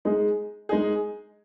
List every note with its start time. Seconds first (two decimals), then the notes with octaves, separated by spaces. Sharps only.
0.05 G#3 D#4 G#4
0.69 G#3 D#4 G#4